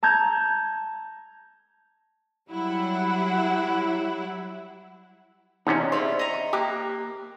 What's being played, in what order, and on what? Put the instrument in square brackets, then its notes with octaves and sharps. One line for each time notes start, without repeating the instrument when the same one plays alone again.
[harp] A5 A#5 G6 G#6
[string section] F#3 E4 [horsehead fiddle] G3 F#5
[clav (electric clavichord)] E2 C3 C#4 [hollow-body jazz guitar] D#4 D5 D#5
[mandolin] A#3 E4 F4 [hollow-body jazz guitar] G#4 D5 [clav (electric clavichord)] C5
[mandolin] D#5 A#5 C#6
[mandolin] A#3 A#5 F#6 [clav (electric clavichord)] G4